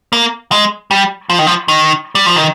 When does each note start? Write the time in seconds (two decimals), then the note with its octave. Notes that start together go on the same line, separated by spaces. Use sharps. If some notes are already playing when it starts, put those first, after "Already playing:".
0.13 A#3
0.52 G#3
0.91 G3
1.30 F3
1.39 D#3
1.47 F3
1.68 D#3
2.15 G3
2.26 F3
2.36 D#3